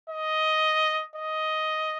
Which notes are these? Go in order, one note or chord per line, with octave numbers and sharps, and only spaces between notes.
D#5
D#5